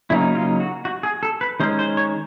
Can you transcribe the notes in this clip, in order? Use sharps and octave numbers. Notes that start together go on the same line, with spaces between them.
C#3 F#3 A#3 D#4 E4
F4
F#4
F#4
G#4
A4
B4
D#3 G#3 C#4 C5
C5
C#5